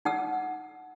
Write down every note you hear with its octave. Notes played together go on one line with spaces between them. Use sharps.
D#4 F#5 E6